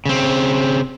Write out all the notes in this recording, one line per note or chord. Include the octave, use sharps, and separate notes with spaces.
C#3 C4